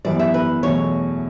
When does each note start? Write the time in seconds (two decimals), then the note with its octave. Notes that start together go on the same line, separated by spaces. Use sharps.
0.05 F#2 E3 G3 B3 D5
0.19 E5
0.34 B4
0.62 E2 B2 F#3 A3 C#5